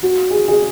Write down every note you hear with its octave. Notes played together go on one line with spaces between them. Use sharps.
F#4
G#4
G#4